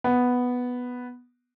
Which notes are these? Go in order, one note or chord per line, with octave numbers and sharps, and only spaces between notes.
B3